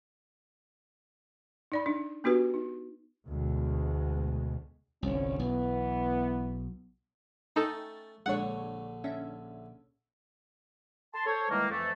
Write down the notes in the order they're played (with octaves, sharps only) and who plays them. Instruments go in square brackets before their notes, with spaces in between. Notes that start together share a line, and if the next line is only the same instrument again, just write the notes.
[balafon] D#4 D5 B5
D4 D#4
B3 D4 F#4 G4 B4
D#4
[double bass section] D2 B2 G#3
[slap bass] G1 C2 [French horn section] D3 F3 C#4
[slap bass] B1 B2 [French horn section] E3 B3
[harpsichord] A3 C#4 [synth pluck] D#4 A4 [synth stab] G5 A6
[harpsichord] A#1 D3 [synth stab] G#3 D4 C#5 [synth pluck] F#5
[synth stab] C#4 D4 E5
[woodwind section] A5 C6
A4 C5 C#5
D#3 E3 G3 G#3 A#3
F2 E3 A3